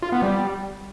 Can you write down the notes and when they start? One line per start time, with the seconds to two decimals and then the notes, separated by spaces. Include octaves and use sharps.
0.02 F4
0.12 B3
0.22 G3